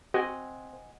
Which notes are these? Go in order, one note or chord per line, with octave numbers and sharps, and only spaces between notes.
C4 F#4 D#5 F#5 G#5